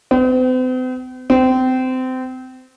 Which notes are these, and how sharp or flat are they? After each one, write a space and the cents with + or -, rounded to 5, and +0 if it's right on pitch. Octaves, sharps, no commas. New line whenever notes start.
C4 -45
C4 -25